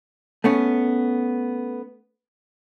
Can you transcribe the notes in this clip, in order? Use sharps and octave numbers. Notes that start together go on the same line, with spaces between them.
A3 B3 C#4